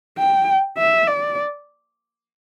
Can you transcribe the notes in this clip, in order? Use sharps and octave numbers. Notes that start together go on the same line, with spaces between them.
G5
E5
D5